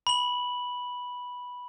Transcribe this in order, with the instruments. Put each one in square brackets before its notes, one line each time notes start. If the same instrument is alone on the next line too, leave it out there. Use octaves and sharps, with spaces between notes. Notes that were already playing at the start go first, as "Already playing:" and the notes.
[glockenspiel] B5 F#7